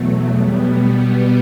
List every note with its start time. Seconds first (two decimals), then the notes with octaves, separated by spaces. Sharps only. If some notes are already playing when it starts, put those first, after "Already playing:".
Already playing: E2 B2 F#3 A3
0.32 B2 G3 B3